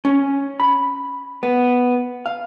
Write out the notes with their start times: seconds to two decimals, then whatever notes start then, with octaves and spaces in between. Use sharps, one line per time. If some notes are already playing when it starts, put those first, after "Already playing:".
0.05 C#4
0.60 B5
1.43 B3
2.26 F5